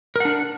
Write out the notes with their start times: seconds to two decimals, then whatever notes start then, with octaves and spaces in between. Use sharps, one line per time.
0.16 A#4
0.20 F#5
0.25 D4